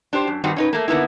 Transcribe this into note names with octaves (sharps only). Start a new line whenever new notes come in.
D4 G4 C5
F#2
G2 D#3 G3 C4 D#4 F#4
C#4 D#4 B4
A3 A#3
D3 A#3 B3 D#4 E4